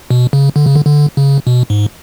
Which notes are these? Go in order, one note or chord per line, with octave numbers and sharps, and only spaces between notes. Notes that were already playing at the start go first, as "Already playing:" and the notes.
B2
C#3
D3
C#3
D3
D3
C#3
B2
G#2